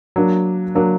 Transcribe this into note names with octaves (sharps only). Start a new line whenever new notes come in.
F#3 A#3 D4
F#3 A#3 D4